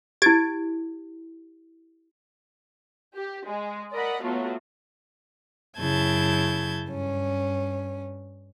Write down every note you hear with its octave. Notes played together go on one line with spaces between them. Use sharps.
E4 G4 G#6 A6 D7
G4
G#3
A#4 D5 D#5 F#5 B5
F#3 A3 B3 F4 F#4
F#2 C#3 E4 A5 G6 G#6
G2 C#4